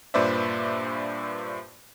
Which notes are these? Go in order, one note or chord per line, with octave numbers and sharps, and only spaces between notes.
G2 A#2 B4 C5 D5 E5